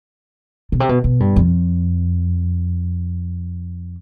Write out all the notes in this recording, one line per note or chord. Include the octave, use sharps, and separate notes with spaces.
B2
C3
B2
B2
G2
F2